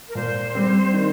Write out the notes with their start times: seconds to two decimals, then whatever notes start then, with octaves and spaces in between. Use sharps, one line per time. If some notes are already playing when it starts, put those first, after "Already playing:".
0.09 A#4
0.15 A#2 C5
0.55 G3 C4
0.93 D#3